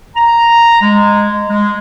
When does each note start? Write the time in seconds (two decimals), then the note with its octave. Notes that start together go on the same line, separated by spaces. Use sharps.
0.16 A#5
0.82 G#3
1.49 G#3